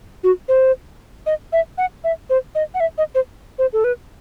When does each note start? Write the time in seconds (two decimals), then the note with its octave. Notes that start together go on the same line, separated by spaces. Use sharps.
0.24 F#4
0.48 C5
1.26 D#5
1.53 E5
1.78 F#5
2.04 E5
2.30 C5
2.55 D#5
2.74 F#5
2.80 E5
2.98 D#5
3.15 C5
3.58 C5
3.73 A4
3.84 B4